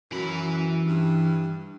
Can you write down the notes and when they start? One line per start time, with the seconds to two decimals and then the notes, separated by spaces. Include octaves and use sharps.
0.12 F#2 E3 B5
0.87 G2